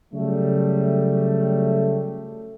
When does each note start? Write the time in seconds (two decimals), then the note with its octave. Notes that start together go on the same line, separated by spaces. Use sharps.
0.13 C#3 F#3 G3 A3